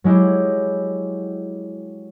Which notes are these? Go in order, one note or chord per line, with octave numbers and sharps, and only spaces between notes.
F#3 G#3 E4 G4